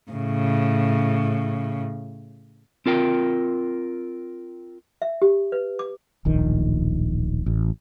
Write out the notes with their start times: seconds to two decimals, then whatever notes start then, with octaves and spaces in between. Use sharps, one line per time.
0.11 A2 C#3
2.86 C4 F4 A#4 G5
5.02 E5
5.22 G4
5.52 B4
5.79 D6
6.25 D1 A#1 D#3
7.46 A1